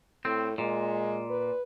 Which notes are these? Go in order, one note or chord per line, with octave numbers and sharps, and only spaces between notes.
A2 C4
A#2 G#3
B4